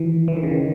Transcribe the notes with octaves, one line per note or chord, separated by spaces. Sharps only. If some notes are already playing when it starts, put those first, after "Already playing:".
Already playing: D#3 E3
E3
D#3
C#3
D#3